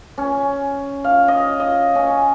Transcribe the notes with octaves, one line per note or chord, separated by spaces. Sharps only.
C#4
F5
D#5
D#5
C#4